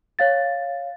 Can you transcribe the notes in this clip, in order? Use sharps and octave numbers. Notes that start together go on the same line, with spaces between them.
C#5 F5 A6